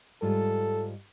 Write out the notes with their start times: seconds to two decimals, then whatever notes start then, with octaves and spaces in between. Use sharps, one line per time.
0.22 G#2 G3 F4 A4